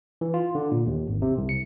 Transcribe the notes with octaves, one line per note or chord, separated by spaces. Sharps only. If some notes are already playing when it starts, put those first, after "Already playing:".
E3
F4
D3
A#2
D#2
G#1
C3
C2
C#7